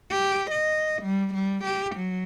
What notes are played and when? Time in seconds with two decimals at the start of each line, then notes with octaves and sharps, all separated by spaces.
0.11 G4
0.51 D#5
1.02 G3
1.34 G3
1.64 G4
1.95 F#3